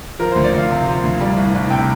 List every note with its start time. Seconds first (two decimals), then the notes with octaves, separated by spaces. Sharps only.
0.19 F3 A#4
0.32 D2 C5
0.44 D5
0.53 D2 F5
0.70 C3
0.87 F3
1.03 D2
1.21 G3
1.37 C2
1.54 C2
1.70 C3 G5